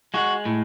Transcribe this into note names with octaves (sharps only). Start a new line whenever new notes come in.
G#3 F#4
A2